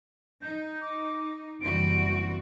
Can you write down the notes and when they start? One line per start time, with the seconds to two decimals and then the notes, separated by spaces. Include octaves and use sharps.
0.42 D#4 G6
0.81 D6
1.61 F#1 E3 G3 C4 F#4 D7